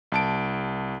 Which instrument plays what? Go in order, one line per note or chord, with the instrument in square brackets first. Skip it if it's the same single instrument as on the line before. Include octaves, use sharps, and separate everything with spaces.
[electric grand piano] C2 A5 D7